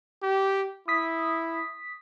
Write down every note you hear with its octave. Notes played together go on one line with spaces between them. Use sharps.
G4
E4 D#6 B6